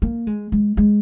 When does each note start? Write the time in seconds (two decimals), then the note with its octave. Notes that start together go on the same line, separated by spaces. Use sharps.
0.02 A#3
0.27 G#3
0.52 G#3
0.77 G#3